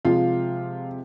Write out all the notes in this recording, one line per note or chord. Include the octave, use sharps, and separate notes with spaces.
C3 F3 G#3 F4 F5